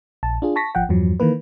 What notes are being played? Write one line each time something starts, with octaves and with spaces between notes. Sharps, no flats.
A#1 A5
D4 F4 G#4
A5 C#6 A#6 B6
G#1 F3 F#5 G5
E2 G2 F3 F#3
D#3 E3 A#3 B4